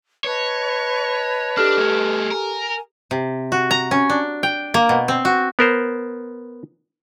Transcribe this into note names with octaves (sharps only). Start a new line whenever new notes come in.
B4 C#5 D#5 A5
D4 G4 A4 F6
A3 G#4
A#4 G#5
C3
F#4
A#5
C#4
D4
G5
A#3
B2
C4
F#4
B3 A#4 C5